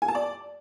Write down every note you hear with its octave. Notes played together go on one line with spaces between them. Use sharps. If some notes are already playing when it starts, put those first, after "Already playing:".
G#5
A5
D5